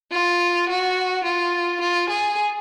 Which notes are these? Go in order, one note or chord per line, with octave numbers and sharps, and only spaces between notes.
F4
F#4
F4
F4
G#4